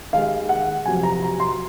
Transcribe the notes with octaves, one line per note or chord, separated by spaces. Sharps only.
D#2 D#3 G#3 F5
F#5
F2 C3 F#3 G#5
A#5
A#5
C6